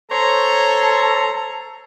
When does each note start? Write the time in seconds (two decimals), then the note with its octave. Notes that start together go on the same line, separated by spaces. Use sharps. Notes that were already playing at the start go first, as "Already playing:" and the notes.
0.12 A4 C5 C#5 A#5